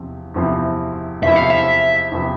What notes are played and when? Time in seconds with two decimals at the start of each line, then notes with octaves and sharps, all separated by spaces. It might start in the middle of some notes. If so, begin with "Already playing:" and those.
Already playing: E2 C3 F3 C4
0.34 E2 C3 F3 C4 E4
1.23 E2 C3 F3 C4 E4 E5
1.36 F5
1.50 E5
2.12 E2 C3 F3 C4 E4